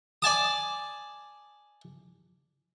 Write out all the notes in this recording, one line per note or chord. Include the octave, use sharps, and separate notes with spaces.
D5 G#5 A5 D#6